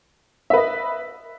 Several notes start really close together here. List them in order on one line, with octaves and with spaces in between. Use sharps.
E5 B4 D#5